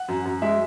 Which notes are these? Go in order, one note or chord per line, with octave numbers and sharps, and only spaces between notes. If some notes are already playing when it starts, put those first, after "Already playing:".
Already playing: F#5
F#2
F#2
G#3 E5